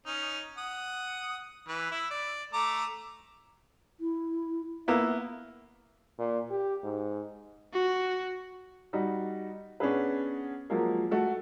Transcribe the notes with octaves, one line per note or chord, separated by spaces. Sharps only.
C#4 D#4
F#5 D#6
E3 B4
E4 E5
D5
A3 A#5 D6
E4
A#3 B3 E4 E5
A#2
G4
G#2
F#4
G3 D#4 F#4
B3 C#4 D4 G#4 B4
F3 F#3 G#3 A#3
A3 F#4